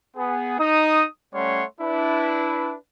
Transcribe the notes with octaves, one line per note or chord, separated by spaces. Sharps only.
B3 G#4
D#4 D#6
G3 A3 C#4 C#5 F#5 C6
D4 E4 B4